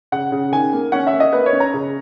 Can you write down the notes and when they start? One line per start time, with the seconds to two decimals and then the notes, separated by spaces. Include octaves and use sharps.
0.12 C#3 F#5
0.32 C#3
0.52 D#3 G#5
0.73 A#3
0.92 C#4 F#5
1.07 E5
1.12 A#3
1.20 D#5
1.33 A#3 B4
1.46 C#5
1.53 C#4
1.60 A#5
1.74 C#3